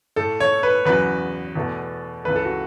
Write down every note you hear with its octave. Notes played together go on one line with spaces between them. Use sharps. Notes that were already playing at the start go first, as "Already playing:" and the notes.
A2 A3 A4
C#5
B4
E2 C#3 F#3 B4
E2 B2 A3
C#2 C#3 E3 A3 B4
A4
F#4